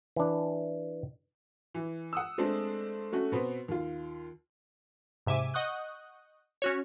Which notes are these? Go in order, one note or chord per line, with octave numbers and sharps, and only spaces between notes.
E3 D4
E3
F#5 D#6 E6
G#3 A3 C4 D4
A3 C#4 F#4
B2 B3 C4
D#2 F4
G#2 C3 E5 G#5 D6 D#7
D#5 F#5 C#6 D#6 F#6 G6
C#4 F#4 C#5